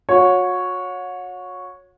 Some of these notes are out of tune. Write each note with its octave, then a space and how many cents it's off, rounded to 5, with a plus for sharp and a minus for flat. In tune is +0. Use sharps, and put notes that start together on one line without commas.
F#4 -35 C#5 +0